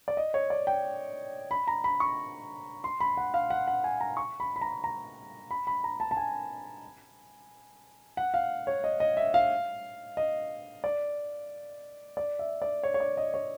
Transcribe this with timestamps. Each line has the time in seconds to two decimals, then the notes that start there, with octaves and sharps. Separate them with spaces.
0.08 D5
0.17 D#5
0.34 C#5
0.50 D5
0.67 G5
1.51 B5
1.67 A#5
1.84 B5
2.00 C#6
2.84 C6
3.00 B5
3.17 F#5
3.34 F5
3.50 F#5
3.67 F#5
3.84 G#5
4.01 A#5
4.17 C#6
4.40 B5
4.56 B5
4.61 A#5
4.84 A#5
5.51 B5
5.67 B5
5.84 A#5
6.00 A5
6.11 A5
6.17 G#5
8.17 F#5
8.34 F5
8.67 C#5
8.84 D#5
9.00 D#5
9.17 E5
9.34 F5
10.17 D#5
10.84 D5
12.17 D5
12.39 E5
12.62 D5
12.83 C#5
12.94 C#5
13.00 D5
13.17 D#5
13.34 C#5